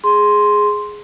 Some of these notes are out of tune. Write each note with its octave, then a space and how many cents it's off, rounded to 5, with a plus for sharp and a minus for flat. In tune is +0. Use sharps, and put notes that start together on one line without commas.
G#4 +0 C6 +0